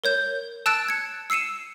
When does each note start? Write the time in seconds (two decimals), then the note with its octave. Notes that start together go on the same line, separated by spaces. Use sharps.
0.04 A#4 C#5 G6
0.66 A5 E6 F#6 A6 D7 E7
0.88 G#6 C#7
1.30 E6 C7 C#7 D#7 E7